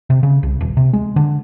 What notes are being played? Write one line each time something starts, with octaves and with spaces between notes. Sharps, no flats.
C3
C#3
C2
D#1
C3
G#3
D3